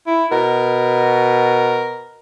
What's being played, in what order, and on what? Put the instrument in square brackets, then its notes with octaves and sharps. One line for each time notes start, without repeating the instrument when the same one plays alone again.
[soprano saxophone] E4
[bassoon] B2 [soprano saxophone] A#4